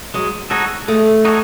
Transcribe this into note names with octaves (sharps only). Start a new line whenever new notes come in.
F#3 G#3
G#3 D#4 F#4 A4 C#5
G#3 A3
D#4 F#4 A4 C#5